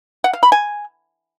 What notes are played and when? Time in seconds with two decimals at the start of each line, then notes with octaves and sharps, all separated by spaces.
0.24 F#5
0.33 F5
0.43 B5
0.52 G#5